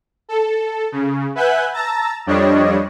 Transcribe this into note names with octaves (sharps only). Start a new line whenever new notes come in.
A4
C#3
B4 E5 F#5 G#5 F#6 G6
A5 A#5 E6 A6
F2 G3 D4 C#5 D#5